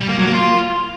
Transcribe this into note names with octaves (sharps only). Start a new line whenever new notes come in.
G3
A#3
F#3
A#3
F4